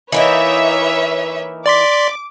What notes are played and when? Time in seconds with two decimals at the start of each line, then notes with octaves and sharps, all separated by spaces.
0.12 E3 A#3 D#4 B4 C#5 E5
1.66 D5 C6 D6 B6